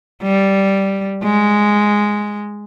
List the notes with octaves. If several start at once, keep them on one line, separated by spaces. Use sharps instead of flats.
G3
G#3